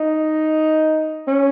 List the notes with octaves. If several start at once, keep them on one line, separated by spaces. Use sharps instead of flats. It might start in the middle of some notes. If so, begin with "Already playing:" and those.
Already playing: D#4
C#4